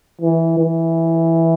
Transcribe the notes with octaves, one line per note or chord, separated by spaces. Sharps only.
E3
E3